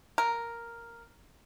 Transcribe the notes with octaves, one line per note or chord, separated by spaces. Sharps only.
A#4